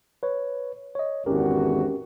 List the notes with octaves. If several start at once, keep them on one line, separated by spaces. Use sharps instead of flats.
B4 C#5
C#5 D#5
G#1 E2 C#4 F#4 G4 A#4